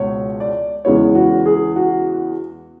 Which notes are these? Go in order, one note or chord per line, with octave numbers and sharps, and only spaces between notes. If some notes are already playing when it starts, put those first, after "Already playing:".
Already playing: C#2 B2 C#5
D5
E2 C#3 G#3 B3 C#5
F#4
G#4
F#4